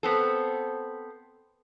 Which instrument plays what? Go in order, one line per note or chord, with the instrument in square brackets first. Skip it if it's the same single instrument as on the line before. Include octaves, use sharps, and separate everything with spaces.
[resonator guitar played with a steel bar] B3 C4 A4